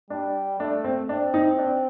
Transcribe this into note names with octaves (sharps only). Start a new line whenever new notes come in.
G3 D4
A3 D4
C4
C4 D4
D#4
D4